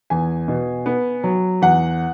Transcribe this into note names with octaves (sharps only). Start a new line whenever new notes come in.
E2 G#5
B2
B3
F#3
E2 F#5